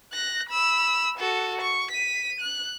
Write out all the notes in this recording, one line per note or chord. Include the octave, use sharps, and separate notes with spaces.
F#6 A#6
B5 E6
F#4 A4
C#6
B6 D#7
F#6